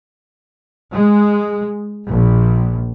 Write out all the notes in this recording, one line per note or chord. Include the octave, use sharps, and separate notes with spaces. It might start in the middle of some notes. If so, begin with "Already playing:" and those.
G#3
A#1